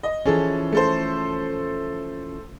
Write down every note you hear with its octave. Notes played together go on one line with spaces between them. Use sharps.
D#5
E3 F3 C#4 G#4 A4
A3 A4 C5